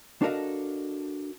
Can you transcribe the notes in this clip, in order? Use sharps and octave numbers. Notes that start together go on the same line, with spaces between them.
D4 F#4 A4 A#4 D#5 F5